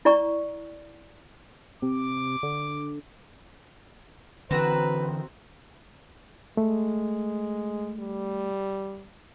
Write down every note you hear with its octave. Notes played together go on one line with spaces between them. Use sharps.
E4 D5 A#5 C#6
C3 D6
D3
D3 E3 C4 F#4 B4 A#5
G#3 A3
G3